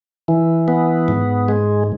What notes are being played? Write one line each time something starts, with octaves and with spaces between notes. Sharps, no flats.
E3
B3
G#2
G#3